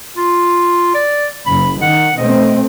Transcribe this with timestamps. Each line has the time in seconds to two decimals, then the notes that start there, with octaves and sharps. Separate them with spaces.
0.17 F4
0.94 D5
1.46 F#1 B5
1.82 D#3 F#5
2.17 B2 A3 C4 D#5